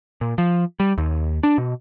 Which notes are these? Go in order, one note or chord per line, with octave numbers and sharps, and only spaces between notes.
A#2
F3
G3
D#2
D4
B2